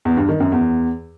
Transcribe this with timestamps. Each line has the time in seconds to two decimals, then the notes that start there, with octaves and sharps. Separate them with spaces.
0.05 E2
0.17 G2
0.29 D#3
0.40 F#2
0.52 E2